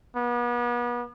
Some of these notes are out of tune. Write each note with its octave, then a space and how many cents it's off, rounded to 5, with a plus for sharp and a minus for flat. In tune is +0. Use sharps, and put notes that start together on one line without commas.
B3 -35